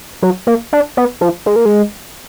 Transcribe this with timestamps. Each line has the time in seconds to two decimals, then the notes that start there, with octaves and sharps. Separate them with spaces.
0.22 F#3
0.47 A#3
0.73 D4
0.97 B3
1.21 F3
1.46 G#3
1.56 A#3
1.65 G#3